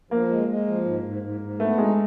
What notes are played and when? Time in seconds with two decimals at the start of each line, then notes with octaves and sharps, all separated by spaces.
0.11 F3 A#3
0.29 G#3
0.48 G#3
0.67 F3
0.85 G#2
1.03 G#2
1.22 G#2
1.41 G#2
1.59 A3 B3
1.78 G#3 D#4